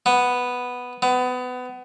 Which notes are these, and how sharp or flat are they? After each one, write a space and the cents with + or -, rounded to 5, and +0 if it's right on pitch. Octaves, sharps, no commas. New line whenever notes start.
B3 +0
B3 +25